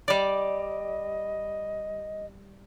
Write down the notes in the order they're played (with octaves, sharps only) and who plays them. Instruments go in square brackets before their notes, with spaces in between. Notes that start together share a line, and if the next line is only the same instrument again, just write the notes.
[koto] G3 D5 [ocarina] D#5